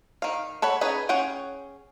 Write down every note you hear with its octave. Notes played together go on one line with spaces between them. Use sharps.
D#3 F5
A4 C#5 F#5 B5
C#4 D#4 G#4 B4
C#4 G#4 F#5 G5